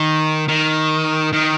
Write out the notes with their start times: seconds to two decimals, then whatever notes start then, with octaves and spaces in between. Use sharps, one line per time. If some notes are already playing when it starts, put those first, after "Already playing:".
Already playing: D#3
0.48 D#3
1.33 D#3